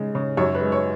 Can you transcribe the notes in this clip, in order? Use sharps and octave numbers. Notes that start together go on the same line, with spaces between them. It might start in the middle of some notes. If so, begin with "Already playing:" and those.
Already playing: C#3 G#3
C#3
F#2 C#5
B4
G#3
C#5